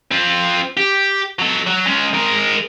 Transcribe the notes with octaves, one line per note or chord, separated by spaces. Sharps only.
C4 F4
G4
F#3 A4
F#3
G#3 C#4
G#3 A#4